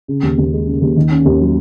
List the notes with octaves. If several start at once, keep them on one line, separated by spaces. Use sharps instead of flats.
C#3
D#2
D#2
G#3
C#3
D#2
D#3
C#4
D#2
F#3